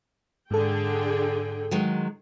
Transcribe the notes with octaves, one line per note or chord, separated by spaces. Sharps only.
G#2 D3 G#4 A4 G5
D#3 F#3 G#3